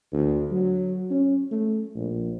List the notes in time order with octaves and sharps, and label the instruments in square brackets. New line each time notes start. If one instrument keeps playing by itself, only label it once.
[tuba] D2
F#3
C#4
A3
A#1